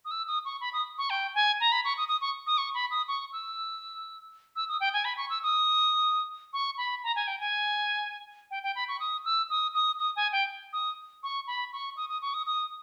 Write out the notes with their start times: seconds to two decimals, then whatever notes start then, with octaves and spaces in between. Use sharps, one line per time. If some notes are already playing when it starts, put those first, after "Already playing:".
0.05 D#6
0.11 E6
0.27 D#6
0.45 C#6
0.61 B5
0.73 D#6
0.98 C#6
1.10 G5
1.35 G#5
1.60 A#5
1.72 B5
1.85 C#6
1.97 D#6
2.08 D#6
2.21 C#6
2.47 D#6
2.58 C#6
2.74 B5
2.91 D#6
3.08 C#6
3.32 E6
4.56 E6
4.68 D#6
4.80 G5
4.94 G#5
5.05 B5
5.17 C#6
5.30 E6
5.43 D#6
6.53 C#6
6.78 B5
7.03 A#5
7.16 G#5
7.27 G5
7.40 G#5
8.51 G5
8.63 G5
8.75 B5
8.88 C#6
9.00 D#6
9.25 E6
9.50 D#6
9.74 D#6
9.99 D#6
10.16 G#5
10.32 G5
10.73 D#6
11.23 C#6
11.47 B5
11.73 C#6
11.97 D#6
12.09 D#6
12.22 C#6
12.34 D#6
12.46 D#6